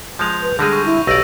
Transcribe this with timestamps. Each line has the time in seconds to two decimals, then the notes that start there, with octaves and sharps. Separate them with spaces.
0.19 F3 G#3 G6 F7
0.42 B4
0.59 D3 G3 G#3 G#4 A#6 D#7
0.72 C#6
0.86 E4
1.07 B1 G4 D5 E6 A#6 D#7